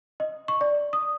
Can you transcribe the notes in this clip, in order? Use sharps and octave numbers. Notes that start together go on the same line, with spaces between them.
D#5
C#6
D5
D#6